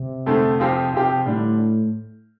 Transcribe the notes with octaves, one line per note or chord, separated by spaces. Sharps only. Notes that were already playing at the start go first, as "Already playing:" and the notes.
Already playing: C3
F2 D3 A3 C4 A4
F2 F3 C4 G4
F2 F3 C4 G4
A2 D3 G3 D4